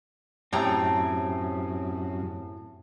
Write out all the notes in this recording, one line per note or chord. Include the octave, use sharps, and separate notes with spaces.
F#2 A2 C4 G4 G#4 G5 A#5